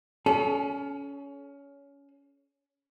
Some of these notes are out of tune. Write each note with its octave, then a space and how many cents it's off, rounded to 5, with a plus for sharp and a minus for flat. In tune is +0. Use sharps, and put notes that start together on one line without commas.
C#4 +20 A4 -40